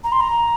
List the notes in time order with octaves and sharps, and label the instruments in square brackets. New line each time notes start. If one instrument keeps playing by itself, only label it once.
[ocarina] A#5
C6
A#5